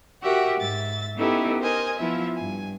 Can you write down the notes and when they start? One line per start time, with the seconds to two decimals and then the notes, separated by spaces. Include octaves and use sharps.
0.22 F#4 G4 A#4 E5 F#5
0.60 G#2 E5 A6
1.16 B3 C#4 D#4 E4 G4 A4
1.62 A#4 C5 D#5 G#5
1.98 F3 B3 E4 F4 E5
2.36 G2 G#5